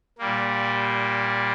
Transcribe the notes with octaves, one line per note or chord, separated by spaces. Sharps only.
A#2 G3 A#3